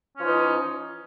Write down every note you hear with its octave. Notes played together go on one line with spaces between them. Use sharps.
E3 F3 C#4 D#4